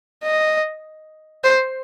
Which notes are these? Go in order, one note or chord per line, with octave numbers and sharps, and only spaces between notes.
D#5
C5